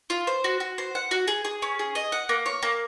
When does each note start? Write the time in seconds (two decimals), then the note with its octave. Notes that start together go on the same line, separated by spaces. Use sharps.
0.10 F4
0.27 C5
0.44 F#4
0.60 F#4
0.78 C5
0.95 F#5
1.11 F#4
1.28 G#4
1.45 G#4
1.62 C#4
1.79 G#4
1.95 D#5
2.12 F#5
2.29 A#3
2.46 C#5
2.63 A#3